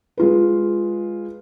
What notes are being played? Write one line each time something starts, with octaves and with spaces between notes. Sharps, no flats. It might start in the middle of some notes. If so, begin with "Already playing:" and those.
G#3 F4 B4